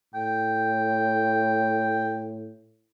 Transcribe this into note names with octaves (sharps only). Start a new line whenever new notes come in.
A2 G5